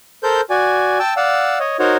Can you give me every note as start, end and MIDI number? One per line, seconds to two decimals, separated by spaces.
0.23 0.41 69
0.23 0.41 70
0.23 0.41 72
0.23 0.41 91
0.50 0.98 66
0.50 0.98 74
0.50 0.98 80
0.99 1.14 79
0.99 1.14 81
0.99 1.14 88
1.17 1.58 74
1.17 1.58 77
1.17 1.58 78
1.17 1.58 88
1.60 1.77 73
1.60 1.77 75
1.79 1.97 63
1.79 1.97 66
1.79 1.97 70
1.79 1.97 72
1.79 1.97 73